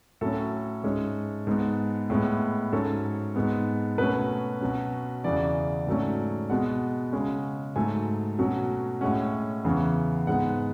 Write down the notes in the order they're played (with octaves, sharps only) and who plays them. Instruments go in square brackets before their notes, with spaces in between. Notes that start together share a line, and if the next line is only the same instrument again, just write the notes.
[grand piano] A2 F#3 C#4 A4
G#2 G#3 C#4
G#2 G#3 B3
A2 G#3 B3
G#2 F#3 C#4 A4
G#2 G#3 B3
B2 F#3 A3 C#4 B4
B2 F#3 C#4
E2 C#3 E3 D5
G#2 F#3 A3 C#4
B2 G#3 B3 F#5
C#3 G#3 C#4
G#2 F#3 A3 G#5
B2 F#3 A3 C#4
A2 G#3 C#4 F#5
E2 C#3 E3 B3
G#2 G#3 B3 F#5